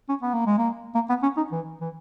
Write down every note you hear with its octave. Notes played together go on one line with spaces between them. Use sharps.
C#4
B3
A#3
G#3
A#3
A#3
B3
C#4
D#4
E3
E3